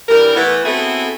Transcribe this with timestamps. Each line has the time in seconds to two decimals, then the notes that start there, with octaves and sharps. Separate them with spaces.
0.09 G2 E3 G3 A#4
0.36 E3 A3 B3
0.64 B3 C4 E4 F#4 G#4 A4